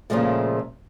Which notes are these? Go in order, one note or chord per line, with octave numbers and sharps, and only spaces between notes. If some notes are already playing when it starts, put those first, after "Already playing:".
A#2 C#3 F3 G#3 A3